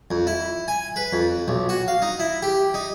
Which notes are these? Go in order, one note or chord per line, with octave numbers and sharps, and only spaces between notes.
F2
E4
G#5
B4
F2
B1
F#4
F5
D#4
E4
G4
D#4